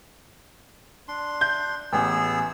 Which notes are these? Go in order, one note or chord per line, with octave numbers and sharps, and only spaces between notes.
D4 C6
G6
A1 B3 G#4 E6